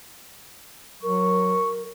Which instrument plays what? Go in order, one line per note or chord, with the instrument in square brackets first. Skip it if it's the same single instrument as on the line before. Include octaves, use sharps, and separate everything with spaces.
[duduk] F#3 [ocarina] A#4 [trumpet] C#6